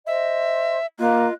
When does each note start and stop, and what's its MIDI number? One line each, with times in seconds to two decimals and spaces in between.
0.07 0.76 72
0.07 0.76 75
0.07 0.86 76
0.07 0.76 84
0.99 1.27 58
0.99 1.33 65
0.99 1.33 75
0.99 1.33 90